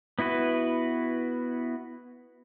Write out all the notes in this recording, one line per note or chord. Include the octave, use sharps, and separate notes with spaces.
B3 E4 F#4 B4